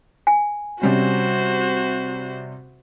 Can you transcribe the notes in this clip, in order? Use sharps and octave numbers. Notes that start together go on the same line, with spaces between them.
G#5
C3 G3 C#4 F#4 C5